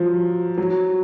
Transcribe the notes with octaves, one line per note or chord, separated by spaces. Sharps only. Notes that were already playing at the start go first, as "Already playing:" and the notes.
Already playing: F3 F#3
F#3